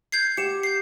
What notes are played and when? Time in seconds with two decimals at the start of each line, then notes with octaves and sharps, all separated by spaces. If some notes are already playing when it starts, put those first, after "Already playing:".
0.12 G6 G#6 C7
0.37 G4 F#5 C#7 E7
0.63 G6 C7